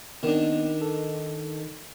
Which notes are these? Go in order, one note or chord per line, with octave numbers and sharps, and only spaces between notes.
D#3 B3 C4 D4
A4